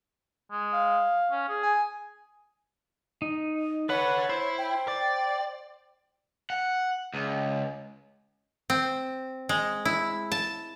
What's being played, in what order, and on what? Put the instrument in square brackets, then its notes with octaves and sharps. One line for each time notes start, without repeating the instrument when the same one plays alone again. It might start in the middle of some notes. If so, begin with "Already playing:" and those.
[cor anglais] G#3
[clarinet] F5
[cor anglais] C#4
G#4
[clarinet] G#5
[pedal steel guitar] D#4
[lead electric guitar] A4 F#5 [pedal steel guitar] B4 B5 [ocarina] C#5
[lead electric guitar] E4 [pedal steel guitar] C5
[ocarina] G5
[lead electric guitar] D5
[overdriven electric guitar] F#5
C#2
[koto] C4
G#3
E4
A5